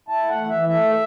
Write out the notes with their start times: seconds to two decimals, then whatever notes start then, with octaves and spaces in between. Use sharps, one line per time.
0.08 E4 A5
0.23 A3
0.29 F#5
0.39 E3
0.49 E5
0.54 E3
0.69 A3 E5